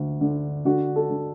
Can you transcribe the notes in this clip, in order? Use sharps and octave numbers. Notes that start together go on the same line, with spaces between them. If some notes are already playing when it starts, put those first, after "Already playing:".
Already playing: D2
D3
D3 F#4
A4
D3